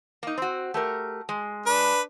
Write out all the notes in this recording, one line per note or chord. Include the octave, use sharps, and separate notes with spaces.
A#3 D#4
C4 F#4
A3 G4 A#4
G#3
D4 B4